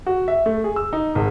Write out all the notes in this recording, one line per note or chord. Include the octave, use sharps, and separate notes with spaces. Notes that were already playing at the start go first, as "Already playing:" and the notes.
F#4
E5
A3
G#4
E6
D#4
G#1